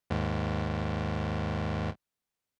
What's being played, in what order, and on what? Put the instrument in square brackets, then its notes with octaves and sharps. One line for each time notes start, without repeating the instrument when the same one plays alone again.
[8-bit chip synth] D#2 G#2